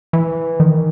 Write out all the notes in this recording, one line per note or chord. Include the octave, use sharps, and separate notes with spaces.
E3
D#3